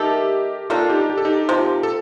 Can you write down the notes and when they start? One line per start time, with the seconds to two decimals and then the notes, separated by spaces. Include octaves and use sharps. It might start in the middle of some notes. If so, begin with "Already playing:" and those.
Already playing: D#3 A3 D#4 G4 A4 A#4
0.70 D#3 A#3 D4 F4 A4
0.90 D#4 G4
1.10 G4
1.18 A4
1.25 D#4 G4
1.49 C3 F3 A#3
1.83 A4